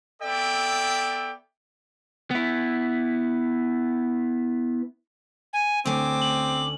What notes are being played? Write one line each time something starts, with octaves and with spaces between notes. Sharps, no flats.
B3 A4 D5 E5 G5
B3 E4
G#5
D2 C4 C#4 D6
F#7